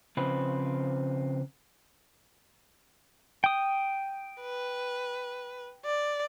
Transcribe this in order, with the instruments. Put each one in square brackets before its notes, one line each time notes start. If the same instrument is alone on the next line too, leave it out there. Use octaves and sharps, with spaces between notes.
[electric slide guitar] C#3 F3 C4 B4
[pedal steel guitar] G5 D#6
[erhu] B4
D5